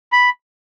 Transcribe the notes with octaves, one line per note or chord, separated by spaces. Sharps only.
B5